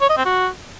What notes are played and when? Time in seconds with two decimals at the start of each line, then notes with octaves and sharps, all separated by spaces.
0.01 C#5
0.09 D#5
0.17 C4
0.26 F#4